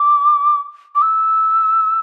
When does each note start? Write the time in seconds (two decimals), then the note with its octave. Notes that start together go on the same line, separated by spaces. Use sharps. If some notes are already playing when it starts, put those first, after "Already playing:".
Already playing: D6
0.95 D6
1.02 E6